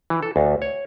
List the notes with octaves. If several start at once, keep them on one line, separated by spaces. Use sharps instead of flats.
E3
A4
D2
C#5